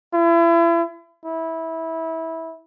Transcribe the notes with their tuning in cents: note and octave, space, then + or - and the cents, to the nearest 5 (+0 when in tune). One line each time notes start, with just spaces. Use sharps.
E4 +35
E4 -20